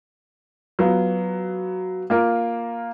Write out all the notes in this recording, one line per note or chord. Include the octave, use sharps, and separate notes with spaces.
F#3 B3 F4
A#3 F4 A#4